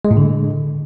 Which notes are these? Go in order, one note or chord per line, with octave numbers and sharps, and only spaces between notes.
G#3
A2
D3